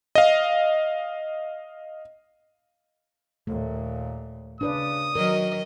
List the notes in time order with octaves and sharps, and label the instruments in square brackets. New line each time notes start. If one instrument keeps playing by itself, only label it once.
[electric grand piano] D#5 F5
[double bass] D#2 A#2 [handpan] A3
[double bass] C#3 [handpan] D4 B4 D5 [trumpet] D#6
[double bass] D#3 [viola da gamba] F#3 D#5 [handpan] A#4